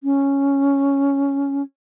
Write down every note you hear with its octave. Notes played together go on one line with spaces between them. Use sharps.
C#4